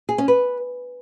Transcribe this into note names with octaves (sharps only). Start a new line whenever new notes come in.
G#4
C#4
B4